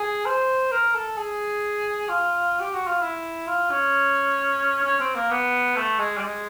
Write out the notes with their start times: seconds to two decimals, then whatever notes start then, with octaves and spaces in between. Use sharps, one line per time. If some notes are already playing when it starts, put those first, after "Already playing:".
Already playing: G#4
0.26 C5
0.72 A#4
0.94 A4
1.17 G#4
2.09 F4
2.60 G4
2.73 F#4
2.87 F4
3.01 E4
3.47 F4
3.70 C#4
4.84 C#4
5.00 C4
5.15 A#3
5.30 B3
5.76 A3
5.99 G#3
6.17 G3
6.22 G#3